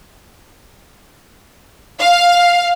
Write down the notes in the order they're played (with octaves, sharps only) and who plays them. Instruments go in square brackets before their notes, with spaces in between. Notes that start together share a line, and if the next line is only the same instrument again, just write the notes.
[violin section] F5